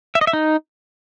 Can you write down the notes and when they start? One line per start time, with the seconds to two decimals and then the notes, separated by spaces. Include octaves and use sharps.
0.15 E5
0.21 D#5
0.27 E5
0.33 D#4